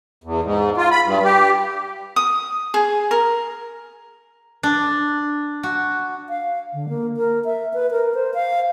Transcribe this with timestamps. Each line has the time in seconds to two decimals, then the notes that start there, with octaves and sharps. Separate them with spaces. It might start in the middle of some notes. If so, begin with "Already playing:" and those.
0.24 E2
0.44 G#2
0.77 F4
0.91 B5
1.05 G2
1.24 G4
2.16 D#6
2.74 G#4
3.11 A#4
4.63 D4
5.63 F#4
6.29 F5
6.73 D3
6.89 A#3
7.17 A#4
7.45 E5
7.74 B4
7.91 A#4
8.14 C5
8.34 F5